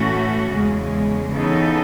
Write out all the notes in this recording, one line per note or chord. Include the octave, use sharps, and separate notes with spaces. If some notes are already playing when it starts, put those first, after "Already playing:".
Already playing: A2 E3 A3 C#4 F#4
E2 C#3 G#3
C#3 E3 B3 D#4 A4